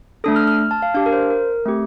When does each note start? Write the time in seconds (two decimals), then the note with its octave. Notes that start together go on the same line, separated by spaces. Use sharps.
0.24 A3 D4 A4 D#6
0.36 F6
0.47 F6
0.59 F6
0.71 A5
0.82 F5
0.95 D4 G4 F5
1.06 A#4
1.13 C5
1.30 A#4
1.66 A3 C4 G4